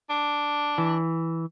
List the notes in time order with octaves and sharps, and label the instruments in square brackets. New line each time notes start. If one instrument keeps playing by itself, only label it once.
[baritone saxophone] D4
[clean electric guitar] E3